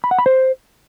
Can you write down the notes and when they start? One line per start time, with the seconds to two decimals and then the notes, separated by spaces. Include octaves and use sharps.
0.04 B5
0.11 F#5
0.19 B5
0.26 C5